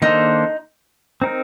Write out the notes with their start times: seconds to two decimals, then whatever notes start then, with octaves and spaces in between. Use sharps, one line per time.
0.02 D#3 A#3 D4 D#4 A4 C5
1.22 C4 D#4 A#4